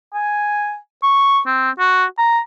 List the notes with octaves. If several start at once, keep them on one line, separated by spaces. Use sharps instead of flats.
G#5
C#6
C4
F#4
A#5